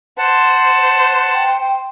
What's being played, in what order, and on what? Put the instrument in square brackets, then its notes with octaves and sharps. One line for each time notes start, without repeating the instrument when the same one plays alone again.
[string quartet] C5 [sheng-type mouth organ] F#5 A5
[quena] G5